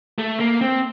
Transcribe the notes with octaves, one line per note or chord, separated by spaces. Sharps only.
A3
A#3
C4